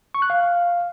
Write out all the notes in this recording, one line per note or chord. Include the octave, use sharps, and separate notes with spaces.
C#6
F#6
F5